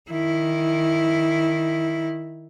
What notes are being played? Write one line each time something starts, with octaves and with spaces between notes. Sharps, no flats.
D#3 E4